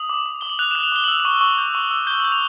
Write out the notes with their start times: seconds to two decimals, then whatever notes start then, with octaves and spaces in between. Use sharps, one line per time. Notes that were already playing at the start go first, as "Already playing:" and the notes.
Already playing: D#6 F#7
0.09 D6
0.26 D6
0.41 D6 G7
0.50 F#7
0.59 F#6 F7
0.71 E7
0.75 F#6
0.83 F7
0.92 D6 G7
1.04 F#7
1.08 E6 F7
1.20 F#7
1.25 C#6
1.41 C#6
1.58 G6
1.75 C#6
1.91 E6
2.07 G6 G7
2.20 F#7
2.24 G6
2.32 F7